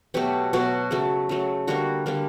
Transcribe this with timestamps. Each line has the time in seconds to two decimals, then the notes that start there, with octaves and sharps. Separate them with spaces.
0.14 B2 F#3 A3 G4
0.53 B2 F#3 A3 F#4
0.91 C#3 F#3 A3
1.29 C#3 F#3 A3
1.67 D3 G3 A#3 F#4
2.06 D3 G3 A#3